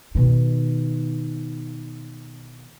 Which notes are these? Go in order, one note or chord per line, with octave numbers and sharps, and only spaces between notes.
B2 D#3